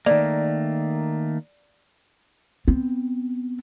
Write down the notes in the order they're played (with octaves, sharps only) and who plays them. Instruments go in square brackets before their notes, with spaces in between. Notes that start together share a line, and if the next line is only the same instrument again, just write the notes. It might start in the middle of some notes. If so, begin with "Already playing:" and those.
[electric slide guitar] D#3 A3 A#3 [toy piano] D5
[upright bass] B3 C4